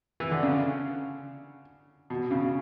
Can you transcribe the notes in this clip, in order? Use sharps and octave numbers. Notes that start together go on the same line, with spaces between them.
E3
D3
C#3
B2
C#3